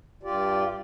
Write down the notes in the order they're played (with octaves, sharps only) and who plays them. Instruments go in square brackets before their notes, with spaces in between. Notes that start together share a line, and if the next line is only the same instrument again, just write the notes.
[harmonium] G2 F4 G4 D5